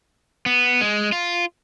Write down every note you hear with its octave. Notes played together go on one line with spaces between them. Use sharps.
B3
G#3
F4